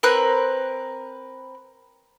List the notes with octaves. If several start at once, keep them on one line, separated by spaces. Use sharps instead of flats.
C4 A#4 B4 F#6